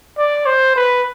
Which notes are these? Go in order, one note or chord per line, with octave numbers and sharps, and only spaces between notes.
D5
C5
B4